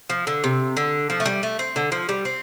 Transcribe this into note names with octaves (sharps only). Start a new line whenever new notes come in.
F3
D3
C3
D3
F3
A3
G3
A3
C4
D3
F3
G3
C4